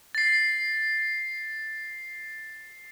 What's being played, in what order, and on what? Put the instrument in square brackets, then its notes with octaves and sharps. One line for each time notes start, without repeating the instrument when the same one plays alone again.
[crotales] A6 C7